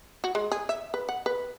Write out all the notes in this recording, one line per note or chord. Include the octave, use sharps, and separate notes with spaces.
F#4
G#3
G#4
E5
B4
F#5
B4